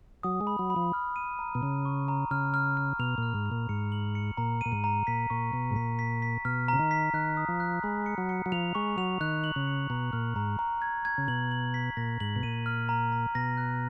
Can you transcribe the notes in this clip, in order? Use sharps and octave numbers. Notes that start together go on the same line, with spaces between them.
F#3 D#6
G#3
B5
F#3
B5
F3
F6
D#7
A#5
B2
C#3 A#5
C#6
A#5
C#3 F6
F6
F6
B2 F7
A#2 F6
G#2
F6
A#2
G#2 C#7
F#7
C#7
A#2 A#5
A#2 D#7
G#2
A#5
A#2 B6
A#2 C#6
B2 C#6
G#2
A#2 B6
B6
B6
B2 F6
C#3 A#5
D#3
B6
D#3 F#6
D#6
F3
F#6
G#3 B5
C#7
F#3
C#7
F#3
F3 F7
G#3 C#6
F#3 F7
D#3 F#6
F#7
C#3
C#7
B2 A#5
A#2 F6
G#2 A#5
A#5
G#6
G#6
C#3
B2 F#7
F#7
B6
A#2 A#6
G#2 F#7
B2
A#2 D#7
F6
A#5
A#5
B2 A#6
F#6